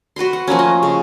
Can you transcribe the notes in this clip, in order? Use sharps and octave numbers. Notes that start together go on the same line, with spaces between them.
F#4 B4 B5 C6
F#5
F3 A3 A#3 C#4
D#5
C#3